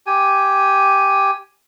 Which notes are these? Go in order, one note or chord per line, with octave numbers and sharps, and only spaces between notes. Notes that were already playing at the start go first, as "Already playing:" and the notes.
G4 G#5